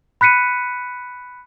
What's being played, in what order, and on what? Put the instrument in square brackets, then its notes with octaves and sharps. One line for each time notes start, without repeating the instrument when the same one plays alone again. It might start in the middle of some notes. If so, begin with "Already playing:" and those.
[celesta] B5 F#6 B6 C#7 D#7